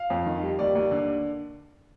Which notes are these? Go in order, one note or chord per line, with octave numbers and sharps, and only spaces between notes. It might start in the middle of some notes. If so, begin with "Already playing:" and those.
Already playing: F5
F2
D#3
G3
D#2 D5
D#2
D3